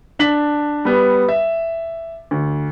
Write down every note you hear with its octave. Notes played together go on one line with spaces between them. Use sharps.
D4 A5 B6 F#7
G3 B3
E5
D2